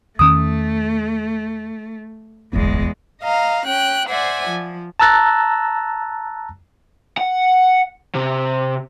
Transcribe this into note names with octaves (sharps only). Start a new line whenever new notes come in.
E2 D#3 A3 C#4 D#6
D1 G1 E2 G#3 B3
D#5 F5 A#5
C#4 G5 F#6
C5 D5 E5 F#5 G#5
F3
A5 A#5 E6 F#6 A6 A#6
F#5
C3